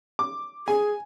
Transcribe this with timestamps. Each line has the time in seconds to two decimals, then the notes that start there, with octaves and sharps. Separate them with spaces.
0.19 D6
0.68 G#4 G#5